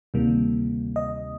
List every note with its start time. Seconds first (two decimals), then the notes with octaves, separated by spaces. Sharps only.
0.14 D2 C3 D#3 G3 A#3
0.96 D#5